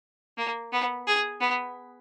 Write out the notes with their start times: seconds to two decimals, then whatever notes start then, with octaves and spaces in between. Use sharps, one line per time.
0.38 A#3
0.73 B3
1.07 G#4
1.41 B3